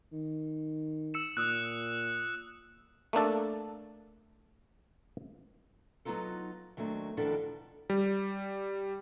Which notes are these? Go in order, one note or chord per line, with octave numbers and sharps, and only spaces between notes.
D#3
E6 C#7 E7
A#2 D#6 E6 F#6
A3 A#3 D4 A4
F#3 G#3 B3 D#4 F4 A4
D#2 F#3 A3 C4 D4
E2 B2 D#3 F3 D4 A4
G3